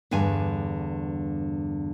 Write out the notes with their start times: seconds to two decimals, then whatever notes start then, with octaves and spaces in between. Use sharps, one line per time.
0.11 E2 G2 D3 G#5